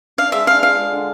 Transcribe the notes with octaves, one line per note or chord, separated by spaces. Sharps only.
D4 F5
G#3 E5
D4 F5
F4 F5
G#3
D3